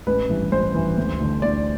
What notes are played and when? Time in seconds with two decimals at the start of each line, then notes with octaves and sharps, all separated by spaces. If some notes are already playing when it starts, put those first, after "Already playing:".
0.07 A1 B4
0.29 G2 E3
0.52 A1 C5
0.74 G2 E3
0.97 D2
1.20 D3 A3
1.42 D2 D5